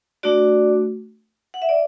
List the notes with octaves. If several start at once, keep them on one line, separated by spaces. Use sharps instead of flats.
A3 D4 F#4 D5
F#5
E5
D5